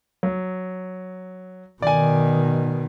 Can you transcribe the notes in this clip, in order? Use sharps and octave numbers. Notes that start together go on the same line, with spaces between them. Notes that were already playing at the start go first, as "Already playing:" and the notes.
F#3
B2 D#3 D5 G#5